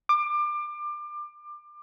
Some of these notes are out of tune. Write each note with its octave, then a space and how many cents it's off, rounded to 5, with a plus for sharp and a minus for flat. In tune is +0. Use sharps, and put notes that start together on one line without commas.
D6 +25